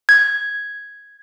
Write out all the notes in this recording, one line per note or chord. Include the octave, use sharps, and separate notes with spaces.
G#6